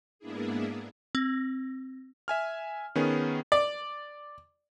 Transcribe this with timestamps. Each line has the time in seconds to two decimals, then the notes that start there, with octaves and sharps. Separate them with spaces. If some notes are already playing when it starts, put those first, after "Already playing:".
0.19 G#2 A#3 B3 D4 E4 G#4
1.15 C4
2.28 E5 G#5 F6
2.95 D#3 B3 C#4 G#4
3.52 D5